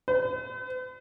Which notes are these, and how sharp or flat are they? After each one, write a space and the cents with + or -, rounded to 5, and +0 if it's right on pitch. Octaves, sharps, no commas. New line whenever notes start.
B4 +45